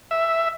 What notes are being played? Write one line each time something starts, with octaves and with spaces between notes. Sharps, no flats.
E5